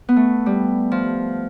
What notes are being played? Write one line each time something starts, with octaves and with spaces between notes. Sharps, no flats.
B3
A3
G3
F3